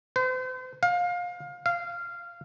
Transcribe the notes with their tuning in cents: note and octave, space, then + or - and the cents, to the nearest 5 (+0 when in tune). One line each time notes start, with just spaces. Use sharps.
C5 -40
F5 +25
F5 -15